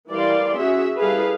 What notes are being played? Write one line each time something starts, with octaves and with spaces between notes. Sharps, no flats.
E3 G3 A#4 D5 F5 C6
C#4 F#4 G#4 E5
G3 E4 G#4 A4 B4 F5